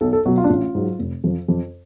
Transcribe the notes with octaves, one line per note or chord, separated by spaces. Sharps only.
B1 A4
A4
B2 F#3 F#4
F4
D4
A1 F4
G#2 F#3
F1
F2 F3
F2